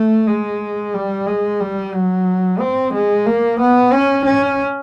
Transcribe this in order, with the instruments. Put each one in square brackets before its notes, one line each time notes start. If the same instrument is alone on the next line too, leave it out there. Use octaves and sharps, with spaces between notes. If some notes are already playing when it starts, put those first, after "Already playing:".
Already playing: [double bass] A3
G#3
G3
G#3
G3
F#3
C4
G#3
A#3
B3
C#4
C#4